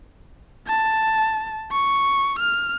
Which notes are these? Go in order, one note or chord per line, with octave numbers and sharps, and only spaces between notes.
A5
C#6
F6